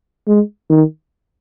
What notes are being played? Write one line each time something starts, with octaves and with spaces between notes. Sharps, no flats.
G#3
D#3